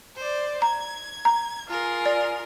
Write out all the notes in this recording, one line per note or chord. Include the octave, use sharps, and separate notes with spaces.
C5 D5
A#5 G#6
A#5
F4 G#4 A#4
D5